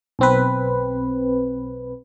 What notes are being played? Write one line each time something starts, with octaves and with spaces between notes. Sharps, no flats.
B1 C4 B4